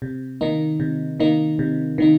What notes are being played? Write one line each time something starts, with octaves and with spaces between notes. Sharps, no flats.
C3
D#3 A#3 D#4
C3
D#3 A#3 D#4
C3
D#3 A#3 D#4